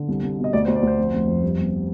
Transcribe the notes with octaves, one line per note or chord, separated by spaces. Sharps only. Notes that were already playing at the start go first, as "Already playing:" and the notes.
Already playing: D3
C2
C2
B2
D#5
D2 D5
C5
D2
D5
D2 C5
F1
F1
F2
G2
G1